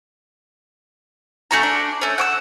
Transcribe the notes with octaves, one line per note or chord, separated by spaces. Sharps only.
A3 C#4 F#4 A#5
D4
A3 C#4
F#5 D6 E6